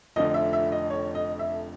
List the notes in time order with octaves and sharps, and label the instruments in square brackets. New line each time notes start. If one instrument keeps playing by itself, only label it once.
[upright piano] F1 F2 D3 F3 D#5
E5
E5
D#5
C#5
D#5
E5